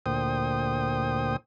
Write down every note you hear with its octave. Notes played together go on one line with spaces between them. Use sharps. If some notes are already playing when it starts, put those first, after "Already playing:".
D2 A#2 C5 G5 D#6